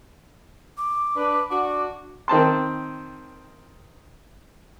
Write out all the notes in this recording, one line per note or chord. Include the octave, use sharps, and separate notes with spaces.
D6
D4 B4
D4 F#4 D6
D#3 C4 A5 C6